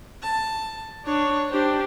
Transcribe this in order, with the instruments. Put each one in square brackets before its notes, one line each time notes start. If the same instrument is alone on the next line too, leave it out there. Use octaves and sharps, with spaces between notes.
[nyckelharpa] A5
[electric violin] D4 [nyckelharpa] C#5
[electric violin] D4 G4 [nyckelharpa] C5